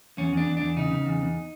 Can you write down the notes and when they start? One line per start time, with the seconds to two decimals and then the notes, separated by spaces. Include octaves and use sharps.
0.17 E2 C#4
0.32 E2
0.37 D4
0.47 E2
0.57 E2 D4
0.76 C#3 D#4
0.91 C#3
1.05 E2
1.21 E2